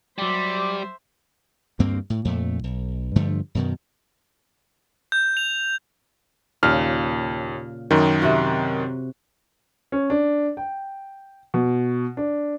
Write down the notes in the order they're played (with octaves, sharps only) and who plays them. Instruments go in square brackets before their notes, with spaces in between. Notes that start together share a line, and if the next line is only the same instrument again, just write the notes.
[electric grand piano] F#3 G4 [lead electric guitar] G3 [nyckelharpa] C5 E5 [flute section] D6
[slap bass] D2 G2 A#3 C4
A2
F2 A#2 A3
B1
G2 D3 F3 A3
F#2 B2 D#3
[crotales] G6
F7
[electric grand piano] D#2 F6 [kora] A#2 C#3
[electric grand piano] F#2 D#3
[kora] C3 C4 F#4
[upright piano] C#4
D4
G5
B2
D4